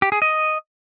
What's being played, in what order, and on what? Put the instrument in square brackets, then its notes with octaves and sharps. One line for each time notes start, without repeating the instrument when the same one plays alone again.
[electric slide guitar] G4
G#4
D#5